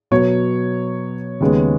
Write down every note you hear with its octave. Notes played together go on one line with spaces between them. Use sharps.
B2 F#3 B3 C#5
D#2 C#3 G#3 B3